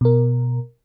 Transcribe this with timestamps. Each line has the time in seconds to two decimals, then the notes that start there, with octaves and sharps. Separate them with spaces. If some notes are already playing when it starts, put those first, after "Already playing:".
0.01 B2 A#4